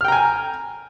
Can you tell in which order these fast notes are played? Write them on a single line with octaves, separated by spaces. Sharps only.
F6 G5 A#5 G#5